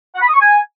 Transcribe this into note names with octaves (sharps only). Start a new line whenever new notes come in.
F#5
B5
D#6
C#6
G#5